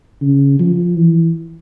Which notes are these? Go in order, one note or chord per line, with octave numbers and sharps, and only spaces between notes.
C#3
F3
E3